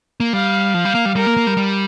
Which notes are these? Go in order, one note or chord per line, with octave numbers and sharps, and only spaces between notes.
A#3
G3 F5
F3
G3
A#3
G3
G3 A#4
A#3
A#3
G3
G3